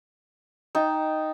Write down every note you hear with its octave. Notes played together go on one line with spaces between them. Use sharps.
D#4 G5 A5